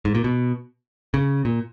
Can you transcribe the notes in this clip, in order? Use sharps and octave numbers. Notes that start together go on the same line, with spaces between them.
G#2
A#2
B2
C#3
A#2